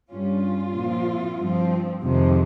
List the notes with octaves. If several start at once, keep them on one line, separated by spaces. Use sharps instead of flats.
G2 G3 C#4 F4
A#2 F3 C4
G2 F3 C4
F2 C3 D#3 G#3